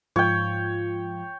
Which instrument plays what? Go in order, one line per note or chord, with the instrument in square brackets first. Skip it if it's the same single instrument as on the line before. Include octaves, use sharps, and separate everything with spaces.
[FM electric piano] G#2 F3 F4 [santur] C#5 G5